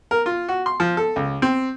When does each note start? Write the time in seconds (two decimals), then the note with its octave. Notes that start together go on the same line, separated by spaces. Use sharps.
0.11 A#4
0.26 F4
0.48 F#4
0.66 C6
0.80 F3
0.97 A4
1.16 C#2
1.42 C4